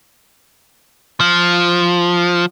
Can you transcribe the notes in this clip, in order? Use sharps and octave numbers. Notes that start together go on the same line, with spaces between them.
F3